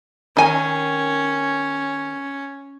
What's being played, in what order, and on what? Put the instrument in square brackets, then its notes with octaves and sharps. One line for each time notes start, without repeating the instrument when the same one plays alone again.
[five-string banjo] D#3 G#5 [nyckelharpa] C#4